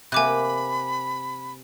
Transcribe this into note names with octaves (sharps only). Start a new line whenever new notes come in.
C3 A#3 G#5 B5 D6 F#6